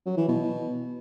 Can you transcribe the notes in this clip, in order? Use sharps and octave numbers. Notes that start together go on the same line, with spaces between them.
F#3
E3
B2